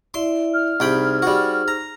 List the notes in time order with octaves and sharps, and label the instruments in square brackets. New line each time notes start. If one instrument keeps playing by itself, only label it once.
[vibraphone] E4 D5 E5 [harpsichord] C6
[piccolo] F6
[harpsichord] C2 G5 B5 [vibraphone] D#4 G#4 C5
[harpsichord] G3 F#4
A#5